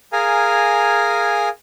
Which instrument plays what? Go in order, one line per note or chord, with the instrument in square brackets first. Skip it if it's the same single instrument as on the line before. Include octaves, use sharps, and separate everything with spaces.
[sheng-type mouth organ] G#4 A#4 F5 G#5 A#5